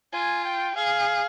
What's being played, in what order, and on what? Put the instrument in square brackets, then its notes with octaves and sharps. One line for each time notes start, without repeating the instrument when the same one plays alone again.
[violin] F4 [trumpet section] G#5
[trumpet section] G5
[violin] G#4 [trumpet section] F5